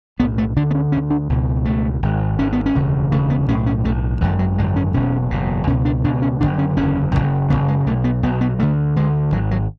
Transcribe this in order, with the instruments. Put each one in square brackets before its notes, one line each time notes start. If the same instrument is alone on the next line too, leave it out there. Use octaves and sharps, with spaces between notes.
[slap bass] B1 B3
A2
A3
D2 D3 D4
B3
C#4
D2 D3 C#4
D4
C#2 B2
C#2 B2 A3
G#1 G#2
G#1 G#2 C#4
B3
C#4
E1 D2 C#3
E1 D2 C#3 A3
B3
B1 A2 C#4
C#4
B1 A2 A3
G#1 F#2 D3 E3
F#3
G#1 F#2 D3 G#3
C#4
F#1 E2 B2 C#4
F#1 E2 B2
C#2 B2 C#4
D4
C#2 B2 D4
C#4
F#1 E2 D3 D4
C#4
F#1 E2 D3 C#4
F#1 E2 C#3
F#1 E2 C#3 B3
G#3
B1 A3
B2
B3
B1 B3
B2
B3
D2 D3 A3
D2 D3 G#3
G#1 F#3
G#2
F#3